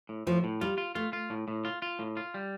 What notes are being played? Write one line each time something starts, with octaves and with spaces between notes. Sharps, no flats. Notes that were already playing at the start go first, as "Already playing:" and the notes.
A2
A2 F3
A2
G3 F4
F4
A3 F4
F4
A2
A2
F4
F4
A2
F4
G3